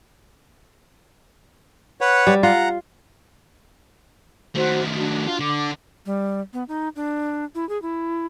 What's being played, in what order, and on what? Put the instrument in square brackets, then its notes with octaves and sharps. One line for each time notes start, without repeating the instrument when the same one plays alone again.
[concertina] B4 C#5 F#5
[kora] G3
[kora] F4 [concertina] F#5 A#5
[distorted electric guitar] D#3 A3 [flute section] F#4 C5
[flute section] D4 F#4
[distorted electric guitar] F4
[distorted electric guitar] D3 [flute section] D6
[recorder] G3
B3
D#4
D4
E4
G#4
E4